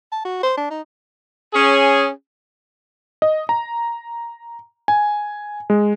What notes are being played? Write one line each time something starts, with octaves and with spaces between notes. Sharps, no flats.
A5
F#4
C5
D4
D#4
C#4 G#4
D#5
A#5
G#5
G#3